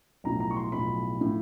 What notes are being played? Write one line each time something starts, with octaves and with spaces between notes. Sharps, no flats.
B1 A2 F3 A#5
A#5
C#6
C6
B1 A2 F3 B5
A2 F3